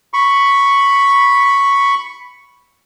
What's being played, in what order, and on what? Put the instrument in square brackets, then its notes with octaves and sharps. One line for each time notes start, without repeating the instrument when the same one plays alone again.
[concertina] B5 C#6